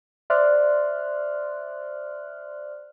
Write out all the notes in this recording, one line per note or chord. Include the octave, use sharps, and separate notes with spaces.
C5 D5 E5 C6 F6 F#6